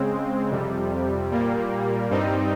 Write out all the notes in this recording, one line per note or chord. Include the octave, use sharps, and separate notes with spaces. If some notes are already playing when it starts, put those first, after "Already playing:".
Already playing: C#3 G#3 C4
F2 C3 G3
A#2 G3 A#3
G2 G3 C4 D#4